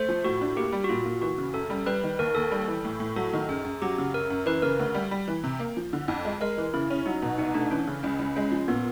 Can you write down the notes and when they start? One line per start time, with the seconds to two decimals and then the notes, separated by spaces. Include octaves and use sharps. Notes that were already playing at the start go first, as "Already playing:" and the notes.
Already playing: A3 C5
0.09 F3
0.24 A2 F#4
0.41 D4
0.56 A#3 G4
0.72 G3
0.84 F#4
0.89 A#2 F4
1.06 A#2
1.22 E3 F#4
1.38 C#3
1.54 F#2 A4
1.70 G3
1.86 G3 B4
2.03 D#3
2.19 D#2 A#4
2.35 D#2 A4
2.51 G3
2.67 E3
2.84 A2
3.00 A2
3.16 F#3 A4
3.33 D#3
3.48 F#2 G#4
3.65 F#2
3.82 F#3 G4
3.98 C#3
4.14 F#2 A#4
4.30 F#2
4.46 E3 B4
4.62 C#3 A#4
4.79 D2
4.94 G3
5.11 G3
5.28 E3
5.44 C3
5.59 A#3
5.77 F3
5.93 D3
6.08 F2
6.25 G#3
6.40 G#3 A#4
6.58 E3
6.74 C#3 E4
6.90 C#4
7.06 F#3 D#4
7.22 B2
7.38 C2 D#4
7.54 A3 D4
7.71 E3 C#4
7.87 C#3
8.03 C#2 C#4
8.19 C#2
8.36 G#3 C#4
8.51 F3
8.68 A#2 B3